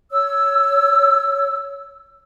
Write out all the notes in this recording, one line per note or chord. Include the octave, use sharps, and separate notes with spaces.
C#5 E6